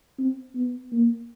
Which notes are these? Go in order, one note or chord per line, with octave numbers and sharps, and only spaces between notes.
C4
B3
A#3